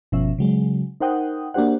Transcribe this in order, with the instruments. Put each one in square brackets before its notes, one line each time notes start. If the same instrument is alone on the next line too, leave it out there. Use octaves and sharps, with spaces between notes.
[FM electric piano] G1 B2 F3 C#4 E5
C#3 F#3 G#3
D#4 A#4 C5 F#5 G5 D#6
A#3 D4 F#4 G4 C5 F#5